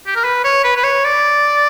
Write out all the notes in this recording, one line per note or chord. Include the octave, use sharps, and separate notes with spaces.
G4
A#4
B4
C#5
B4
B4
C#5
D5